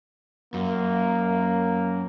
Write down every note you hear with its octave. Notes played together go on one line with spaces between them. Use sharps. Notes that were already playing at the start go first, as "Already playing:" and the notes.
F#2 A#3